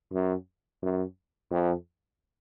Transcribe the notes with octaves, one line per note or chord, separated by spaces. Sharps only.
F#2
F#2
F2